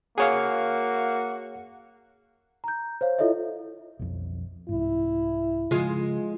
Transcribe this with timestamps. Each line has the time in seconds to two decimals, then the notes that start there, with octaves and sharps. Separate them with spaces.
0.18 A#3 F#4 G#4 C#5 F5
2.64 A#5 G6
3.01 C5 C#5 F5
3.19 E4 F4 A4 C#5 D#5 E5
3.99 B1 F2
4.69 C2 G#2 E4
5.71 C#3 F3 G#3 F4